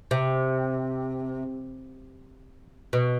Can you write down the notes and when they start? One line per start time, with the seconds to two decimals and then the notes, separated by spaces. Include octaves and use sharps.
0.11 C3
2.93 B2